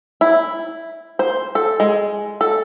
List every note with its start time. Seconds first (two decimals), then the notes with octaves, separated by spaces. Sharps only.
0.21 E4
1.19 C5
1.55 A4
1.80 G#3
2.41 A4